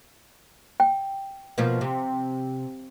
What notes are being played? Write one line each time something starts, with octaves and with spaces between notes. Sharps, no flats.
G5
B2 F3 A#3
C3